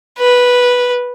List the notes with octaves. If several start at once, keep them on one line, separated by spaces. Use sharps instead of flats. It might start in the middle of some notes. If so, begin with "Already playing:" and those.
B4